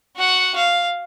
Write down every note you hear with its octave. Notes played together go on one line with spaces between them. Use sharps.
F#4 F#5
F5